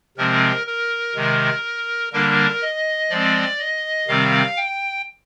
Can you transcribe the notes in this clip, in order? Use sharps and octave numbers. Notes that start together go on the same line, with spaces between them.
C3 F3 G#3 C4 A#4
A#4
C3 D#3 G#3
D3 G3 A#3 D4 A#4
D#5
F3 G#3 C4 D5
D#5
C3 D#3 G3 C4 F5
G5